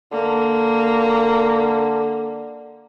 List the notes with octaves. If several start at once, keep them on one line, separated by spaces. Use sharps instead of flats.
D3 A#3